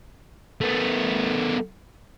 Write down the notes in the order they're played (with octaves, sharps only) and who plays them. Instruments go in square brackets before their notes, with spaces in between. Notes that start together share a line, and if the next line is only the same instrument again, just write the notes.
[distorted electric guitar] A3 B3